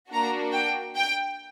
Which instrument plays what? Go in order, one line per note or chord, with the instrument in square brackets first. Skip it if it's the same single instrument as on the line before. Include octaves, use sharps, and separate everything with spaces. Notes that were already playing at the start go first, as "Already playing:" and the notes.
[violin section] A#3 D4 F#4 A#5
G5
G5